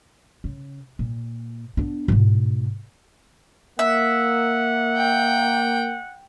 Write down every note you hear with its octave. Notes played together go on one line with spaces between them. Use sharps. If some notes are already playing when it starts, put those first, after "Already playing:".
C#3
A#2
B3 D4
G#2 B2
A#3 E5 F#5
G5